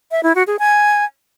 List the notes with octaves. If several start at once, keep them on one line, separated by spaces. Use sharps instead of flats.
E5
E4
F#4
G#4
G#5